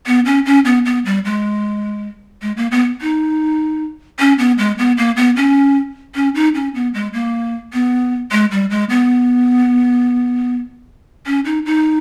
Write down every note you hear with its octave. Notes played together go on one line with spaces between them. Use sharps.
B3
C#4
C#4
B3
B3
G3
G#3
G#3
A#3
B3
D#4
C#4
B3
G#3
B3
A#3
B3
C#4
C#4
D#4
C#4
B3
G#3
A#3
B3
G#3
G3
G#3
B3
C#4
D#4
D#4